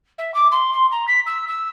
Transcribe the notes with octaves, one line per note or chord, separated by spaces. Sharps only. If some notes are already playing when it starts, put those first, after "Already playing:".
E5
D6
C6
C6
A#5
B6
E6
E6